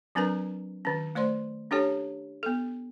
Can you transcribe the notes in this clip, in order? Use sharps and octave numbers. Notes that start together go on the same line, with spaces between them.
F#3 C4 D4 A#4 B4 A#5
D#3 C#4
A3 C5 D5 C6
C#4 D4 G4 A4 C#5
B3 A4